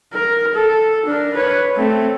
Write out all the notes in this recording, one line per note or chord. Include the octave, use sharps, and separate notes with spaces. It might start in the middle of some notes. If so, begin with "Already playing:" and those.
A#4
A4
D4 A#4
B4 C#5
A3 C4